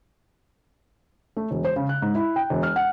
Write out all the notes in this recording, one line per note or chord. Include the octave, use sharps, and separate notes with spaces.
A3
E1
C5
C#3
F#6
G#2
E4
G5
E1
F6
F#5